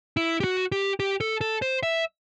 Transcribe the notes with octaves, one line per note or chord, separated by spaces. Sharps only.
E4
G4
F#4
G4
G4
A4
A4
C5
E5